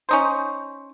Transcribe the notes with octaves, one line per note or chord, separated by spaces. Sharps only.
C#4 D#4 C5